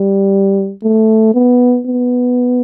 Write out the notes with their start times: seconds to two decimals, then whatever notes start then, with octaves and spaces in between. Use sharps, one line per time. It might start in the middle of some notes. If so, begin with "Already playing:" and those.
Already playing: G3
0.83 A3
1.35 B3
1.87 B3